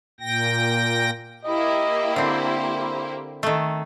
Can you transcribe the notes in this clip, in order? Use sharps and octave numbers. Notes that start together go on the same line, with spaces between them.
A#2 G5 A#6
A#3 E4 G4 D#5
D3 C4 C5
D#3 A3